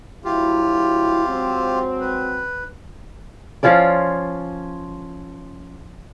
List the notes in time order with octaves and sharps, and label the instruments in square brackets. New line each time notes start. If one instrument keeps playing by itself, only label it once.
[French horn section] D2 F#3 E4 [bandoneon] F4 G4
[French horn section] F#3 G#3 C4
[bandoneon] B4
[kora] F3 C#4 F4 D5